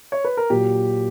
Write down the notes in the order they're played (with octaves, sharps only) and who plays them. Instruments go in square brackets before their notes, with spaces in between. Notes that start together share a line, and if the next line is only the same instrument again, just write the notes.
[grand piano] C#5
B4
A#4
A#2 F#3 G4